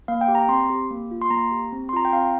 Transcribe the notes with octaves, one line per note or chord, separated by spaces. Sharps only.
A#3 F5
G5
G4
A#5
C4 C6
G4
A#3
F4
C6
A#3 A#5
G4
C4
C6
F4 A#5
G5
C4 F5